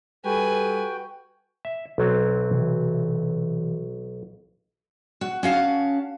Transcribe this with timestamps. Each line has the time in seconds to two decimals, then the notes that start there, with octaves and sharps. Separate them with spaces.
0.25 G3 F#4 A4 B4 G5 G#5
1.65 E5
1.98 B1 F#3 C4
2.51 C3 E3
5.21 F#4
5.43 C#4 F#4 F5 A5